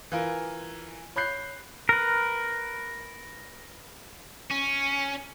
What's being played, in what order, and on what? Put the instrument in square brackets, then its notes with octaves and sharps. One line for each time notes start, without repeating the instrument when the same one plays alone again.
[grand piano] E3 F4 A#4
C#5 B5 F#6 G6 C7
[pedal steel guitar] A#4 B4
[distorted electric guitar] C#4